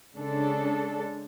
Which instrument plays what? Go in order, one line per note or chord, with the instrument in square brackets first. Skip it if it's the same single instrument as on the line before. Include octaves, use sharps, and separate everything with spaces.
[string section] C#3 G#3 D4 A4